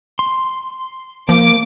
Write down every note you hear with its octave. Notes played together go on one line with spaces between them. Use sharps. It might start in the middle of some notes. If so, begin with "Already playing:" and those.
C6
F3 A#3 D6